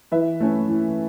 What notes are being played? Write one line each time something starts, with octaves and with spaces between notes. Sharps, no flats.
E3 B4 E5
A3 C#4
E3